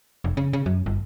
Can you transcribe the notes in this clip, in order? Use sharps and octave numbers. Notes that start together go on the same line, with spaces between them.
F1
C#3
C#3
F#2
G1